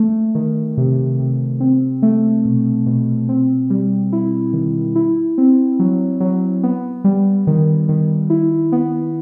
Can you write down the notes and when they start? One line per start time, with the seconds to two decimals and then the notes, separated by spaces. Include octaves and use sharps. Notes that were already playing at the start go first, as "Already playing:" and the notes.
Already playing: A3
0.35 D#3
0.77 C3
1.19 C3
1.60 C4
2.02 A3
2.45 B2
2.86 B2
3.29 C4
3.70 G3
4.13 E4
4.53 D#3
4.95 E4
5.38 C4
5.79 F#3
6.20 F#3
6.63 B3
7.04 G3
7.47 D#3
7.89 D#3
8.30 E4
8.72 B3